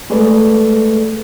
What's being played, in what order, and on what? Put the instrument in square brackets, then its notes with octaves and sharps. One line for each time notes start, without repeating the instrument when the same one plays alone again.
[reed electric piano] G#3 A3 G#4 A4 B4 D5